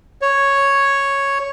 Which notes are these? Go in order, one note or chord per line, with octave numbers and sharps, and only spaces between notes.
C#5